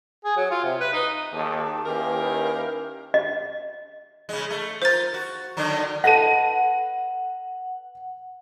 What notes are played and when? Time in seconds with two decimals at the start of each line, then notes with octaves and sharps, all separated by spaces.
0.25 G#4
0.36 F#3
0.51 F4
0.64 C3
0.80 B4
0.93 D#4
1.33 D#2 G#4 A5 D6
1.86 D#2 C#4 E4 G4 A#4 B4 F5
3.14 D#5
4.29 C#3 G#3
4.50 A3
4.82 F4 A#4 C5 A6
5.14 F#4
5.57 D3 D#3 F#3
6.04 A4 B4 D#5 F#5 A#6 D#7